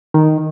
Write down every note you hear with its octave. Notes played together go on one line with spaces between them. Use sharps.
D#3